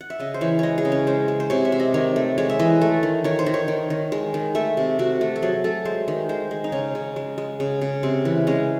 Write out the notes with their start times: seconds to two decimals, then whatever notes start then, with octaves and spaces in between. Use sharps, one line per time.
0.01 F#5
0.10 E5
0.20 C#3 D#5
0.34 C5
0.41 E3 C#5
0.59 G#3 C#5 D#5
0.78 G#4
0.85 C#3
0.92 C#4
1.07 G#3 C5
1.28 G#3
1.40 C5
1.50 C3 C#5
1.65 E5
1.72 C3
1.80 D#5
1.94 D#3 C#5
2.16 A3
2.38 G#3 C#5
2.50 E5
2.59 E3 D#5
2.81 A3
3.03 D#3
3.24 D#3 C#5
3.39 C5
3.46 D#3
3.54 C#5
3.68 D#3
3.90 D#3
4.12 G#3
4.34 D#3
4.55 A3 E5
4.77 C3
4.99 C3 F#4
5.21 A3
5.36 A4
5.42 F#3 G#4
5.64 A3 A4
5.85 G#3 C5
6.08 D#3
6.29 G#3 C5
6.51 G#3
6.64 D#4
6.72 C#3 C#4
6.95 C#3
7.16 G#3
7.38 G#3
7.60 C#3
7.81 C#3
8.03 C3 C4
8.25 E3
8.47 G#3 C#4